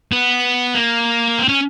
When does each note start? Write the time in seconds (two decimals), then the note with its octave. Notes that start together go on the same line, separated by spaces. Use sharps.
0.12 B3
0.75 A#3
1.39 C4
1.49 C#4